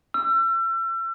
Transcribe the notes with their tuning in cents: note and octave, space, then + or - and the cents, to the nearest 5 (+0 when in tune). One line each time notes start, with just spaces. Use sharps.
E6 +35